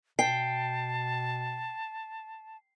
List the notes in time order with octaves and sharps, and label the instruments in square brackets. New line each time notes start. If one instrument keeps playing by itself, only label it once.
[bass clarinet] B2 [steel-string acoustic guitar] G5 [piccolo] A5 [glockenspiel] C7